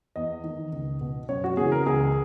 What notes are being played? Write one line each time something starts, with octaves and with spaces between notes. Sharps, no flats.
E2 D#5
D#3
C#2
B2
F#2 C#5
F#4
C#3 E3 G#4
A#4
C#2 G#4